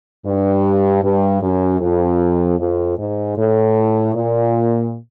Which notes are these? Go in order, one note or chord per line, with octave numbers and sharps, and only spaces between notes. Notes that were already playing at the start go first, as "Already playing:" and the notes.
G2
G2
F#2
F2
F2
G#2
A2
A#2